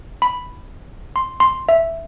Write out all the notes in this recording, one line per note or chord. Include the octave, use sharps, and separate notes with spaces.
B5
C6
C6
E5